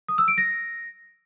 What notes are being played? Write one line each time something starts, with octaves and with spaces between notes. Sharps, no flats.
D#6
E6
D7
A#6